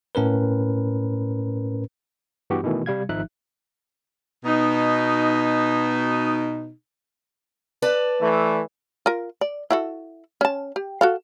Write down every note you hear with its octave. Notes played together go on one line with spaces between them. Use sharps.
A2 C#4 A#4 B4
G2 E3 B3 F#4 G4
B2 D#3 E3 A3
C3 G3 F5 G#6
G#1 F3 D#4 E5 F#6
B2 D#4
B4 D5 A5
E3 A3
F4 A#4
D5
E4 F#4 A4
C#4 A5
G4
F#4 A4 F5